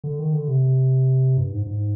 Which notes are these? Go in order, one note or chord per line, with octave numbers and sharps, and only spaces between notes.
D3
D#3
D3
C3
G2
G#2
G#2